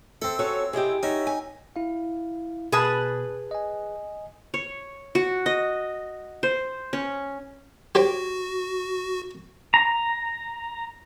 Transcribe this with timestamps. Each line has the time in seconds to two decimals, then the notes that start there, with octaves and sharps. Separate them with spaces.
0.22 C4 A4 E5
0.39 C#4 F#4 A4 C#5
0.73 C3 E4 G4 G#4 D#5
1.03 C#4 D#4 F#4 E5
1.27 G#5
1.76 E4 F5
2.72 B2 G#4 B4 A5
3.51 D#5 G#5
4.54 C#5
5.15 F#4
5.46 D#5
6.43 C5
6.93 C#4
7.95 F#4 G4 C5 G5
9.74 A#5